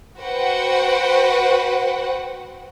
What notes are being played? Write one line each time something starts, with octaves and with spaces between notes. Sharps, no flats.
F#4 B4 C5 F#5 G5